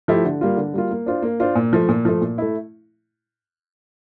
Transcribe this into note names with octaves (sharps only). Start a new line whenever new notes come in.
F3 A3 E4 G4
D3
G3 A#3 F4
D3
G3 A#3 F4
A#3
D4 F4 C5
A#3
D4 F4 C5
A#2
F3 A3
A#2
F3 A3
A#2
A3 E4